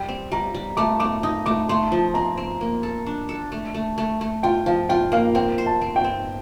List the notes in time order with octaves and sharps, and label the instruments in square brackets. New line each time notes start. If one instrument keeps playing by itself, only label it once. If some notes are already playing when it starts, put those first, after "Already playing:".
Already playing: [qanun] G3 [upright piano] G5
[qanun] C4
[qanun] G3 [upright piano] A#5
[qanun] G3
[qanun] A3 [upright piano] D6
[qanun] A3 [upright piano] D6
[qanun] D#4 [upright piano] D#6
[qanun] A3 [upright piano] D6
[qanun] A3 [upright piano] C6
[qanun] F3
[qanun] C4 [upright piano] A#5
[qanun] C4
A#3
A4
D4
A4
A3
A3
A3
A3
[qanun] F4 [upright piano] G5
[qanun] F3 [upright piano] F5
[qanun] F4 [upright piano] G5
[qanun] A#3 [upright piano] F5
[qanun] C4 [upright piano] G5
[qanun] C5
[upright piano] A5
[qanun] C4
[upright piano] G5
[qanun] C4